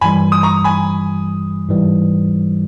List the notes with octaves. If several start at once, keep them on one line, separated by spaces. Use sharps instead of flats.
G2 E3 G3 G#5 B5
D#6
A#5 C#6
G#5 B5
G#2 E3 G3